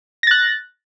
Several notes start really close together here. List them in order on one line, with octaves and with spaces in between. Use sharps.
A#6 A6 F#6